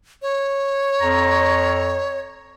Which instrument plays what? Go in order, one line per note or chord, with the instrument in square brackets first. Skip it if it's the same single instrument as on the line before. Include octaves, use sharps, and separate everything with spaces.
[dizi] C#5
[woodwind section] F2 A#5